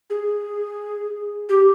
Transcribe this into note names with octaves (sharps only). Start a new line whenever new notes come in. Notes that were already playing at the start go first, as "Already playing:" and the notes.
G#4
G4